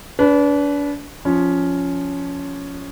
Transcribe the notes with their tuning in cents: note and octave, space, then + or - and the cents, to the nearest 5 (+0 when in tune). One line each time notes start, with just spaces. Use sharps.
D4 -35 B4 +0
F3 +5 C#4 +10